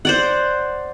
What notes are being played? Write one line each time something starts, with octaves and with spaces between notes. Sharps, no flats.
C5 D5 F#5